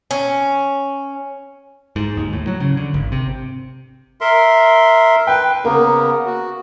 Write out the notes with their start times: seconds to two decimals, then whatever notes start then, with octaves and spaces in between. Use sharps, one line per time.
0.11 C#4
1.96 G#2
2.17 D#2
2.33 A2
2.47 F#3
2.60 C#3
2.77 D3
2.94 G#1
3.12 C3
4.21 A#4 E5 C6
5.27 B4 G5
5.65 C#3 A#3 B3 A#4
6.26 F#4